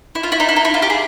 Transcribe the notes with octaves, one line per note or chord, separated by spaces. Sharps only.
E4
F4
E4
D#4
E4
D#4
E4
F4
G4
G#4